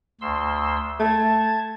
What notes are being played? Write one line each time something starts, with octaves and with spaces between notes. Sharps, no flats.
D2 C6 E6
A3 A5 G#6